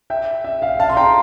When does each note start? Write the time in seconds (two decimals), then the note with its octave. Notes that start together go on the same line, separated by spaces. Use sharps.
0.10 E5 G5
0.44 E5
0.62 F5
0.80 F5 A5
0.89 C6
0.97 G5 A#5